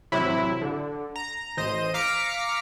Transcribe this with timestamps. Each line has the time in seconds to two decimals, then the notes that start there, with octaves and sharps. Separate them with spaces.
0.12 A1 C3 F#3 E4
0.61 D3
1.16 A#5
1.57 A1 C5 D#5 D#7
1.94 F5 A#5 D6 F6 B6 C#7